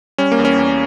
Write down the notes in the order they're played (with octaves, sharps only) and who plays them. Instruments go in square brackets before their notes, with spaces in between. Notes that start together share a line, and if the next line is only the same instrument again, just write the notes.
[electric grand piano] G3 C#4
A#3
E2
C#4
E2